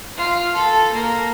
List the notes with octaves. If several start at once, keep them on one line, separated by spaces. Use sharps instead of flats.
F4
A4
A#3